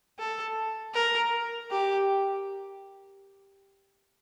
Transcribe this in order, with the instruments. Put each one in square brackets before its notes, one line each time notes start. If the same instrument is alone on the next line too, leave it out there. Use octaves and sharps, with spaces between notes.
[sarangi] A4
A#4
G4